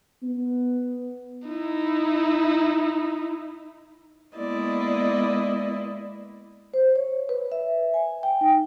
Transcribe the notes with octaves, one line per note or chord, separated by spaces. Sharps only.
B3
D#4 E4
G#3 A#3 B3 E4 D5 D#5
C5
C#5
B4
E5
G#5
G5
D#4